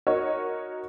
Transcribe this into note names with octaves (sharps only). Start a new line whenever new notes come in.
D#4 F#4 A#4 C#5 D#5